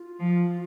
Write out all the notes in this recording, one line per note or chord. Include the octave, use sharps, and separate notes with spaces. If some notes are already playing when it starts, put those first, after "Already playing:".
Already playing: F4
F3